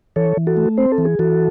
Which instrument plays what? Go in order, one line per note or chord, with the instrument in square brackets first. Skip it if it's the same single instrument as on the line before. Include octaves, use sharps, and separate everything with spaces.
[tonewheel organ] E3 A4 C#5
E3
F#4 A4
A3
C4 C5
A4
E3
G#4
E3 F#4 A4